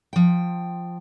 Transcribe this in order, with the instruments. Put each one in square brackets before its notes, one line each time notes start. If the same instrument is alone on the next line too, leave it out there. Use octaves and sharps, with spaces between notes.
[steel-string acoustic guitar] F3 G5